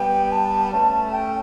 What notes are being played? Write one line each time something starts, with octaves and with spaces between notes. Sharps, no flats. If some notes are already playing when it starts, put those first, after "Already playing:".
Already playing: G3 B3 G5
A5
A3 C#4 A5
A5
G5